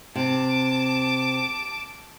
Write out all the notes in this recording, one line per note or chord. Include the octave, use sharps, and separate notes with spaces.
C3 A5 D6